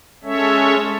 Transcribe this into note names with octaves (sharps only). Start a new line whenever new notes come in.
G#3 C#4 A4 C#5 E5